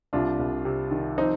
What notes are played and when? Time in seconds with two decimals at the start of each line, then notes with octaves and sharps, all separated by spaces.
0.13 C2 D4 F4
0.39 C2
0.65 C3
0.91 D#3
1.18 F3 C4 D#4